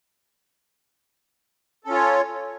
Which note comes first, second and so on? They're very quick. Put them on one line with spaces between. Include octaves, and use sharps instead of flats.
A4 C#4 F4 C#5